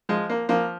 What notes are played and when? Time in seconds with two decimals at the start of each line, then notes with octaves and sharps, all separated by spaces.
0.09 F3 G#3
0.30 A#3
0.49 F3 A#3